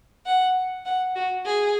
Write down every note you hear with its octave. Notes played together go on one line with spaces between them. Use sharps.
F#5
F#5
F#4
G#4